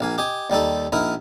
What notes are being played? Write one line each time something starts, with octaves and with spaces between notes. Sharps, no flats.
A#1 A#3 G#5
G4 D#5 G#5
D#2 G3 D#4 A4
A#1 D#4 E4 A#4